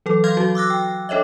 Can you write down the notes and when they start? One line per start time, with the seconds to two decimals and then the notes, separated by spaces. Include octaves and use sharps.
0.06 E3 F#3 A4
0.24 F5 C6 F6 G6 G#6
0.37 F#3 F#4
0.55 D6 E6 F#6 A#6
0.70 G5
1.09 D4 A4 C#5 D#5 E5